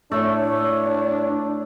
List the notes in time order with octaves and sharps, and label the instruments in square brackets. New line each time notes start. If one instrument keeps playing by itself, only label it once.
[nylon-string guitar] A2 A4 D5 [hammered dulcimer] A3 [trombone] D4 [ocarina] C#5